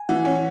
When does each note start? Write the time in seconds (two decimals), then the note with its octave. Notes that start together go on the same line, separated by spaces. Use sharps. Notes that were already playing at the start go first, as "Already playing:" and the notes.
Already playing: G#5
0.09 E3 F#5
0.25 C#4 G#5